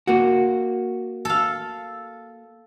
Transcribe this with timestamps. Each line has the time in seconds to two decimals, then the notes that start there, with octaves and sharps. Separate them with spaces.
0.07 A#3 F#4
1.25 A4 F5